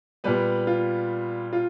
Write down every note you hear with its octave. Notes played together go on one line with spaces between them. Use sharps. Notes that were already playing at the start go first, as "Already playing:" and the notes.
A#2 G3 B3 B4
F4
F4